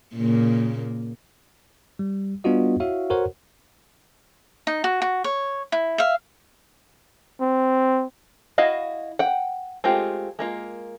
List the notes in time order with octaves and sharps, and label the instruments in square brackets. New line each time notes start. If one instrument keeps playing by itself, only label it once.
[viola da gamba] A#2 C#3 A#3
[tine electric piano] G3
G3 B3 D4 F4 F#4 D#5
E4 F#4 C#5 E5 F5
F#4 A4 A#4 C5 C#5 F#5
[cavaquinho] D#4
F#4
F#4
C#5
E4
E5 F5
[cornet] C4
[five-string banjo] E4 F#4 D#5 F5
F#5 G5
G#3 A3 C4 F4 G4
G#3 A#3 F4